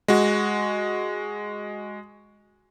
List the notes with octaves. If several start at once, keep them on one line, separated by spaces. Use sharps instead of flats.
G#3 F#4